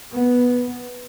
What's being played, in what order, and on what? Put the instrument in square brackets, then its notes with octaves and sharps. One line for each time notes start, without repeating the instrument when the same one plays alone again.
[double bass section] B3